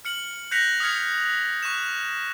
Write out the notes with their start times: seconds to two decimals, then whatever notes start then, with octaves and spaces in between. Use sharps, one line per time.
0.05 F6 C#7 F#7
0.51 F#6 G6 A#6 B6 C#7 F7
0.80 D#6 F6 G#6 C#7
1.63 C#6 F#6 E7